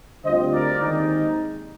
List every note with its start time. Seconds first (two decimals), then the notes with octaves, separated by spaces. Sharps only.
0.24 D2 D3 G3 C4 F4 C5 D#5
0.52 A#4 D5
0.80 D#2 D#3 G#3 C4 D#4